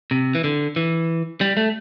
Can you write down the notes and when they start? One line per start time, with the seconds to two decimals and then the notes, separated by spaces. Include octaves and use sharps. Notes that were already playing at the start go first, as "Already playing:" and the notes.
0.11 C3
0.35 E3
0.44 D3
0.76 E3
1.41 G3
1.57 A3